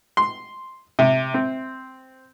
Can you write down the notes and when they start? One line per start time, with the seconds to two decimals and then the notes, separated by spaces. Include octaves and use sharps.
0.17 C6
0.99 C3
1.34 C4